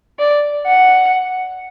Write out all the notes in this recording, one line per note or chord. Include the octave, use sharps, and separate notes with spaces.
D5
F#5